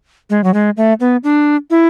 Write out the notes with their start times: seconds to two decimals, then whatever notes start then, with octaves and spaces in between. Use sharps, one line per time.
0.30 G#3
0.44 F#3
0.54 G#3
0.77 A3
1.00 B3
1.24 D4
1.70 E4